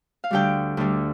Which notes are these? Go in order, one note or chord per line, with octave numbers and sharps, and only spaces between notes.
F5
D2 D3 G3 G4 G5
D2 D3 G3